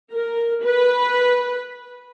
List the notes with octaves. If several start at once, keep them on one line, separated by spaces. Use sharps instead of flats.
A#4
B4